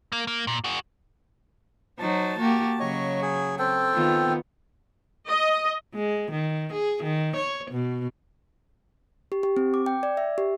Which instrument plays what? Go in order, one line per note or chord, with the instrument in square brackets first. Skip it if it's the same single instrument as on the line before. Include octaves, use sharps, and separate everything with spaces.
[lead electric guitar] A#3
A#3
A#2
F#4 G#4
[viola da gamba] F#3 D#4 C5 [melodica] A5
[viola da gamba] A#3 F#4 G4
[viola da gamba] C#3 F#3 [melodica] C#5 D#5
[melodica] G#4
C4 A4 G5
[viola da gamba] D#3 B3 F4
[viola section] D#5
[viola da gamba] G#3
D#3
G#4
D#3
C#5
B2
[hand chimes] G4
G4
C4
D6
G5
D5
E5
G4